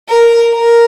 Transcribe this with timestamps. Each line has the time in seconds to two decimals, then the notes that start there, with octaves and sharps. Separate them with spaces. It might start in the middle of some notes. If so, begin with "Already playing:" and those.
0.10 A#4
0.54 A#4